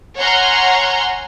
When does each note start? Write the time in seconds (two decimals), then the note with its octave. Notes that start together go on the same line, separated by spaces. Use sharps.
0.19 C#5 F#5 G#5 A#5 C6 F6